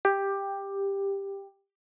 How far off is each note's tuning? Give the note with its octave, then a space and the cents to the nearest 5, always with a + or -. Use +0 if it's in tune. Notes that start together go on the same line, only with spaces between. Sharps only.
G4 +10